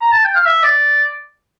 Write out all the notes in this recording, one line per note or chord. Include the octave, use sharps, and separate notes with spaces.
A#5
A5
G5
F5
E5
D5